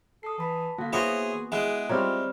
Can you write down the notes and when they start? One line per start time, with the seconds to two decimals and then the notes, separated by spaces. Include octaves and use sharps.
0.23 A4 D#6 C7
0.38 E3 A5 B5
0.78 D3 A#3 F#4 F5
0.93 A#3 B3 E4 F#4 G#4 C5 C#5 C6
1.52 G#3 E4 G#4 F#5 F#6 D7
1.89 G3 C4 F4 C#5 A#5 E6 F6